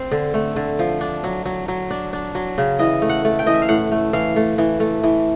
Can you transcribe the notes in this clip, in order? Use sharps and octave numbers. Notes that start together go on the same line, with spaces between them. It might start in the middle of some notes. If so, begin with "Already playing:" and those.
Already playing: C4
D3
A3
D3
F3
D4
F#3
F#3
F#3
D4
D4
F#3
C#3
E3 D#5
A3
F#5
A3
G5
E3 D#5
E5
F5
A2 F#5
A3
E3 F5
A3
E3
A3
E3